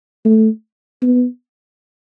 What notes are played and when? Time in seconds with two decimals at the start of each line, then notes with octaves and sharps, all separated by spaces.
0.25 A3
1.02 B3